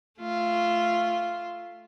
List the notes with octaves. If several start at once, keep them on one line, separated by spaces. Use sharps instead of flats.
A3 F4